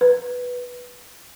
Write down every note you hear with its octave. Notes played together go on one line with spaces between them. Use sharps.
B4